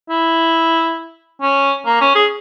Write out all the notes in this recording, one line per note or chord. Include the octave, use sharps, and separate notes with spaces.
E4
C#4
A#3
C#4
G#4